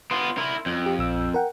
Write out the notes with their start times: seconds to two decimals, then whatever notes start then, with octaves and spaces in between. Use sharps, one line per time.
0.11 B3 F4 C6
0.38 E4 A#4
0.66 F2
0.86 G4
0.99 A#1 E6
1.34 A#4 F#5 G5